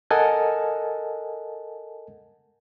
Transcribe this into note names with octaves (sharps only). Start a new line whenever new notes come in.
A4 A#4 D#5 F#5 G#5 A5